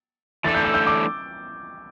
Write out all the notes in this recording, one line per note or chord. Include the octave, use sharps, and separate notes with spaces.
E3 A3 D4 A4 A6
G6
E6
G6
D6